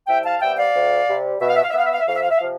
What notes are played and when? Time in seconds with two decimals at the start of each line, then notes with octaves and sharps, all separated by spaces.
0.07 C2 E5 G5
0.25 F5 A5
0.41 C3 G3 B3 E5 G5
0.58 D5 F5
0.74 D2
1.08 C3 G3
1.41 B2 E5
1.48 F5
1.56 E5
1.63 F5
1.70 E5
1.74 B3 F5
1.85 E5
1.92 F5
2.00 E5
2.07 F2 F5
2.16 E5
2.22 F5
2.30 E5
2.37 F5
2.40 C3 F3